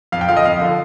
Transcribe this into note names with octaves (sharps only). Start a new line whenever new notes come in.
F2 F5
G5
D3 F3 F5
D#5
F2 F5
D3 F3